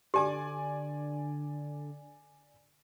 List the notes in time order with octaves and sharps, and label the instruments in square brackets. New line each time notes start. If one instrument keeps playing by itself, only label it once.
[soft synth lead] D3 [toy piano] G4 [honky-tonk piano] D5 G#5 D6